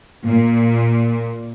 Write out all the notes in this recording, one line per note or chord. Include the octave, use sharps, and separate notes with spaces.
A#2